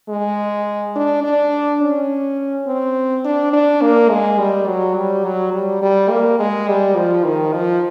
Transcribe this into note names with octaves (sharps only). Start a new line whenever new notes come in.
G#3
D4
D4
C#4
C4
D4
D4
A#3
G#3
G3
F#3
G3
F#3
G3
G3
A#3
G#3
G3
F3
D#3
F3